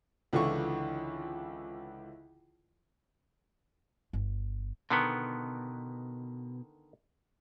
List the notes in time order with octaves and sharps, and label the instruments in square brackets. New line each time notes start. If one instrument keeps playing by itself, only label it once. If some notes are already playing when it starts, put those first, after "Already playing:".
[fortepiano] C#2 D3 E3 F4 C#6
[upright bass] G1
[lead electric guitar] B2 [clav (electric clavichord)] D3 D#3 B3